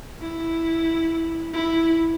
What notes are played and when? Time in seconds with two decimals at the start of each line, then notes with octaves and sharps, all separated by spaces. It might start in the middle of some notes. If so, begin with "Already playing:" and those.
0.21 E4
1.53 E4